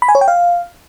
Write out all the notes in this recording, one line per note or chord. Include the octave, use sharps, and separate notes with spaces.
B5
G#5
C#5
G5
F5